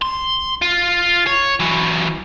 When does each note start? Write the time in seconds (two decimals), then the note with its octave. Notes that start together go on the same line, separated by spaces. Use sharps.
0.02 C6
0.62 F4
1.27 C#5
1.60 E3 F#3